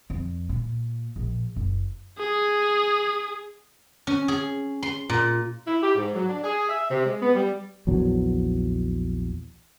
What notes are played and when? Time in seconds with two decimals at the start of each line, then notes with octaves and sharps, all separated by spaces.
0.10 F2
0.49 A#2
1.16 A#1
1.56 F#1
2.19 G#4
4.07 C#4
4.28 G#4
4.83 C6
5.09 A#2
5.67 E4
5.83 G4
5.96 G#2
6.15 F#3
6.29 D4
6.44 G#4
6.69 E5
6.90 C3
7.05 G#3
7.22 B3
7.35 G3
7.87 A#1 E2 F#3